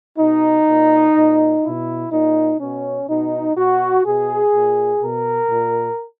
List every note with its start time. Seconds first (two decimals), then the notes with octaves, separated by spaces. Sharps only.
0.18 B2 D#4
0.67 A#2
1.15 A#2
1.64 B2 E4
2.12 A#2 D#4
2.60 B2 C#4
3.08 B2 D#4
3.57 B2 F#4
4.05 B2 G#4
4.53 A#2
5.01 B2 A#4
5.50 A#2